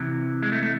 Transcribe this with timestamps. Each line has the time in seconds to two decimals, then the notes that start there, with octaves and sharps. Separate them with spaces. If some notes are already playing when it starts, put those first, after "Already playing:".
Already playing: C3 E3
0.42 G#3
0.52 A3
0.63 A3